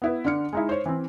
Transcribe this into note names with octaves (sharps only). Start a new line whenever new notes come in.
B3 E4 B4
D3 D4 F6 C#7
G#3 D#4 E4
C5 C#5
E3 C4